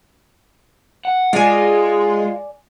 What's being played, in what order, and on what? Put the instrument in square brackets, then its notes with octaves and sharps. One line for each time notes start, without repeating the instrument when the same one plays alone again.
[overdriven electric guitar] F#5
[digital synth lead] G#3 [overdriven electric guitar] F4 [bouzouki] D5 G#5